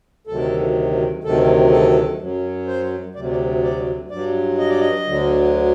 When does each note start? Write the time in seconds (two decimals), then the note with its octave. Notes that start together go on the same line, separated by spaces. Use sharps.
0.27 D2 C3 D#3 F#3 A4
1.24 D2 C3 D#3 F#3 A4
1.71 A4
2.19 F#2 F#3
2.67 C5
3.15 D2 C3 F#3 D5
3.31 D5
3.63 D5
4.10 G2 F#3 D5
4.58 D#5
4.70 D5
4.80 D#5
5.07 D2 D3 F#3